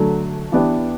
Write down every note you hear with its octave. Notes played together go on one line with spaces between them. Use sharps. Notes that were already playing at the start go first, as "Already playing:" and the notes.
Already playing: D3 F#3 A3
E3 B3 D4 G4